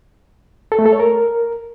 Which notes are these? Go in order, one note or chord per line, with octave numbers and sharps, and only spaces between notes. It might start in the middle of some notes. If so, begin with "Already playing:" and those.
A4
A3
A4
C#5
A#4